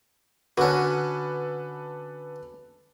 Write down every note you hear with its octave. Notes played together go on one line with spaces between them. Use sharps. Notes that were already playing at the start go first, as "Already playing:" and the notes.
D3 C#4 F#4 A4 B4